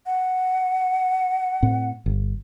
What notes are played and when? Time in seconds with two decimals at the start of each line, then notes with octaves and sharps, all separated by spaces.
0.06 F#5
1.63 A2 C4
2.06 G1